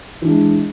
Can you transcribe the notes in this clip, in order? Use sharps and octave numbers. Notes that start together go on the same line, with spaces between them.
E3 G#3 D4